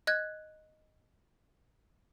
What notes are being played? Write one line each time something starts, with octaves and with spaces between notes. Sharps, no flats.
D#5 F#6 G#6